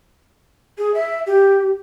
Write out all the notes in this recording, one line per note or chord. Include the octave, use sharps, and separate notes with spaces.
G#4
E5
G4